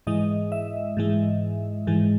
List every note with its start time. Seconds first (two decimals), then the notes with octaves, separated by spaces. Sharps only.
0.07 G#2 E3 G#3 D#5
0.52 E5
0.97 G#2 E3 G#3
1.87 G#2 E3 G#3